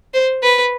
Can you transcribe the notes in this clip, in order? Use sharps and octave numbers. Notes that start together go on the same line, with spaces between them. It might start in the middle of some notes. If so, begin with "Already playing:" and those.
C5
B4